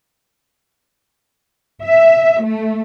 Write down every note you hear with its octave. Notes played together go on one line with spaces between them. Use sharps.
E5
A3